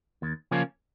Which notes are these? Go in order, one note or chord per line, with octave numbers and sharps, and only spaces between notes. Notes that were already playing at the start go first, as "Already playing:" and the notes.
D#2
C#3 F3 A#3 C#4